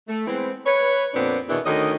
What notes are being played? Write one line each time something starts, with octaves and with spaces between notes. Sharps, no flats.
A3
E3 G#3 B3 C4
B4 C#5
F2 A#2 B3 C4 D4 D5
E2 B2 D#3 E3 B3 D4
D2 D#3 C#4 D#5